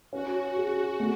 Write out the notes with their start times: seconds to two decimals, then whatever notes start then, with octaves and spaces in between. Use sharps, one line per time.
0.13 C#4 F#4
0.57 G#4
1.00 A3